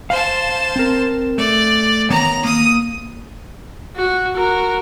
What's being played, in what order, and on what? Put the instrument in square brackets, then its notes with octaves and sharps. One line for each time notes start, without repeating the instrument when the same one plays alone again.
[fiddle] C5 A5 [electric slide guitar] F5
[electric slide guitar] C4 A#4
[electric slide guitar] A3 [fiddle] D5
[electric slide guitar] D#3 B3 C#5 [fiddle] A#5
[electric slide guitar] A#3 [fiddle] D#6
[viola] F#4
F#4 A#4